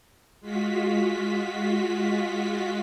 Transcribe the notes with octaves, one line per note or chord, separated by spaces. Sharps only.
G#3 F4 F#4 B6